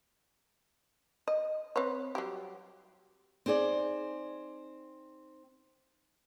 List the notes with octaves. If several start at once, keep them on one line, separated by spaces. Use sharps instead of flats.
D#5
C4 B4 C#5
F#3 G3 G4
C4 D#4 G#4 D5